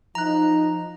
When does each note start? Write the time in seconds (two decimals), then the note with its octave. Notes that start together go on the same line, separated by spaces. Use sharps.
0.15 F3 D#4 A#5 F#6